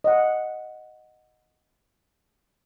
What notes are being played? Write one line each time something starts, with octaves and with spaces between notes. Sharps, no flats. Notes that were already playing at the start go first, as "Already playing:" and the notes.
D#5 F#5